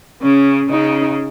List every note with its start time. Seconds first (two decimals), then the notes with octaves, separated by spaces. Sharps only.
0.22 C#3 C#4
0.70 C#3 D#4